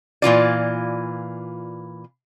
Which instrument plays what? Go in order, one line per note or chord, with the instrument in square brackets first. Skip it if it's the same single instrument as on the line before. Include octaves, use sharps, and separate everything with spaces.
[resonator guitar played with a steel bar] A#2 E3 F4 D5